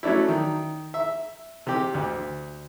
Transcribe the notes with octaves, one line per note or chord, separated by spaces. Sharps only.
F#3 A3 C#4 D4 E4
D#3
E5
C3 G4
D2